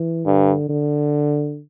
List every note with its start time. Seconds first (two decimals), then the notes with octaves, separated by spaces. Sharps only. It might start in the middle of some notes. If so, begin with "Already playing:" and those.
Already playing: E3
0.26 G2 D3
0.69 D3